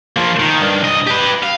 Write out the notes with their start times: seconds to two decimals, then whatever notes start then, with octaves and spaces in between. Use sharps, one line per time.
0.16 F3 A#3
0.40 D#3
0.61 G2
0.84 C2 D#5
1.07 G4 B4
1.43 F5